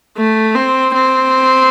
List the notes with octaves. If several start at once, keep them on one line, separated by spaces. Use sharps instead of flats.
A3
C4
C4